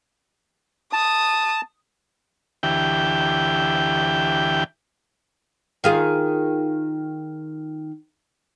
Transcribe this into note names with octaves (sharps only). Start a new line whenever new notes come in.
A5 D#6
D2 E3 G4 G5
D#3 F4 G#4